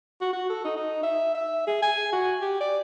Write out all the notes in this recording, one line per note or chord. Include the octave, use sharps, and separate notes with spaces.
F#4
F#4
A4
D#4
D#4
E5
E5
G#4
G#5
F#4
G4
D5